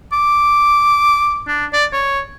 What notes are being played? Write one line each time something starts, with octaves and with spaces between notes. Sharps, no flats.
D6
D4
D5
C#5